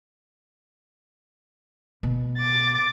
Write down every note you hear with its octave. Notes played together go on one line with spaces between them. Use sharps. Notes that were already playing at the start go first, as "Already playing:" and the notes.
B2
D6 A6